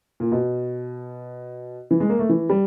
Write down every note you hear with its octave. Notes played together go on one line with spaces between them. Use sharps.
A#2
B2
E3
G#3
A#3
A3
E3
G3